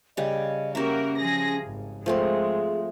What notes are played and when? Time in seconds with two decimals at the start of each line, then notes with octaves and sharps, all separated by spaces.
0.17 C#3 G3 D#5
0.75 A#3 C#4 F#4 G4 A#4 E5
1.17 F3 G#4 A#6
1.63 G#1
2.06 F3 G#3 A3 C4 G#4